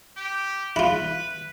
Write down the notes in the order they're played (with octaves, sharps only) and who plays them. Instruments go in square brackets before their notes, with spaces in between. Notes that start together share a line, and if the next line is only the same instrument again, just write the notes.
[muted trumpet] G4
[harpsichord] E4 F4 [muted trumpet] B4